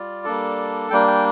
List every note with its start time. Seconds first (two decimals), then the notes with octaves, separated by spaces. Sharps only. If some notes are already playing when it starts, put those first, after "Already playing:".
Already playing: G3 F4 D5
0.25 G3 A#3 D4 A4
0.90 G3 A#3 D4 G5
1.07 G5